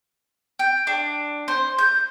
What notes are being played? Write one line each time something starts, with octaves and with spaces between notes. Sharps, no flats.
G5
D4
C5
G6